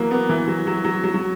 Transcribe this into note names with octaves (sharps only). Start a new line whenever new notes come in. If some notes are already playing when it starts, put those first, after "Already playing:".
Already playing: E3 F#3 A#3
B3
E3
F#3
F#3
F#3
F#3
F#3